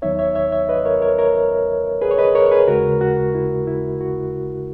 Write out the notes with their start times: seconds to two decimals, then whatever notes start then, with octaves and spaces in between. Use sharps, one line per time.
0.02 D#2 D#3 F#3 B3 D#4 C#5 E5
0.19 C#5 E5
0.35 C#5 E5
0.52 C#5 E5
0.69 B4 D#5
0.85 A#4 C#5
1.02 A#4 C#5
1.19 A#4 C#5
2.01 G#4 B4
2.11 C#5
2.18 B4 D#5
2.35 A#4 C#5
2.46 C#5
2.52 G#4 B4
2.68 D#2 C#3 G#3 F#4 A#4
3.01 F#4
3.35 E4
3.67 E4
4.01 F#4